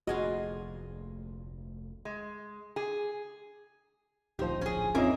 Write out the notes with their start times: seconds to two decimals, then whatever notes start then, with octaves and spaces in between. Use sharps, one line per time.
0.07 F1 D2 A#2 F4 F#4 G#4 D#5
2.05 G#3
2.76 G#4
4.39 D1 A#1 F3 D#4 G4 C5
4.61 C#4 G#4
4.95 F2 A#3 C#4 D#4 A#4 D#5 E5